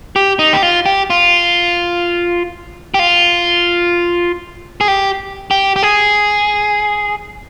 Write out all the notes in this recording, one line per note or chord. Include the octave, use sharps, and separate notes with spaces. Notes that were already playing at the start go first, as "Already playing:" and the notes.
G4
D#4
G4
F4
G4
F4
G4
F4
G#4
G4
G4
G4
G#4